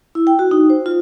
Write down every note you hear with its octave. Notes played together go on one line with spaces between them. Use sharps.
E4
G5
F#4
D#4
C5
F4